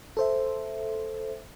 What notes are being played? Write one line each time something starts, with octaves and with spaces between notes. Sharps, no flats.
A4 C5 E5